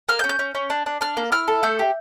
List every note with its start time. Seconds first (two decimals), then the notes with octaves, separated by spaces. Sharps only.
0.09 A#3 F6
0.19 G6
0.24 C#4
0.29 G6
0.39 C#4
0.55 C#4
0.70 D4
0.86 D4
1.01 D4 F6
1.17 A#3
1.32 E4 F6
1.48 A4
1.63 A3 G6
1.79 G4